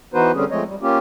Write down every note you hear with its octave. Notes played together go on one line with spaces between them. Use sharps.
E3 B3 D#4 F#4 B4 C5
D3 G3 C4 C#4 G#4
F3 G#3 A3 C4 C#5 D#5
G3
A#3 C#4 F4 G4